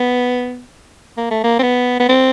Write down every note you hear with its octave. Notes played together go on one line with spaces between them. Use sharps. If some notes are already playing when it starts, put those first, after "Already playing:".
Already playing: B3
A#3
A3
A#3
C4
B3
B3
C4